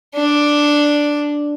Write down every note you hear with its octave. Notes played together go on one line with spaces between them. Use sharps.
D4 D5